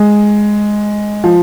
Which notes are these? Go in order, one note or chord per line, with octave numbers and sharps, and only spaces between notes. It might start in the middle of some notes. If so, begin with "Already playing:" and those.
Already playing: G#3
F3